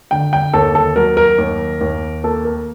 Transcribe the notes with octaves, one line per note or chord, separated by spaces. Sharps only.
D3 G5
G5
D#2 A4
A4
F#3 A#4
A#4
D#2
D#2
A#3 A4
A#4